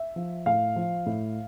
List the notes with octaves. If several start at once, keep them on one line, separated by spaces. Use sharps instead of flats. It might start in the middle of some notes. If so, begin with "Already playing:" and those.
Already playing: E5
F3
A2 F5
F3
A2